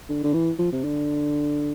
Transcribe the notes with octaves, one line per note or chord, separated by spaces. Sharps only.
D3
D3
E3
F3
C3
D3